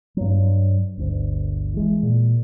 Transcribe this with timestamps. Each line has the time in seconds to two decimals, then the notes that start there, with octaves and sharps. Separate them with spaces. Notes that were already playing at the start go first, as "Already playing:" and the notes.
0.17 G2 F#3
0.97 G1 D2
1.74 E3 G#3
2.03 A#2